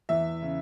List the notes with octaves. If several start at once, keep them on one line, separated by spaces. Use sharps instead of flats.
E2 E5
C#3